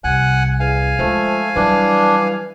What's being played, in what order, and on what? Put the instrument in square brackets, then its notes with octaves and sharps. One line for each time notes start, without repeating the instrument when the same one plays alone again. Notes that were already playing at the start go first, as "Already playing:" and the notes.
[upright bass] C2 [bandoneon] F#5 G#5 F#6
[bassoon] E2 [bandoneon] F5 G#5
[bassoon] F3 [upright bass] G#3 D4 [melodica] A3
[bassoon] E3 [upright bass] F#3 G3 [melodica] D4